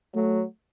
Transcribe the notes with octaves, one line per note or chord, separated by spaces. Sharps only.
F#3 A3